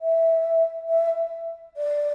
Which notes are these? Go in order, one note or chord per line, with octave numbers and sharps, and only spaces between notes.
E5
E5
D5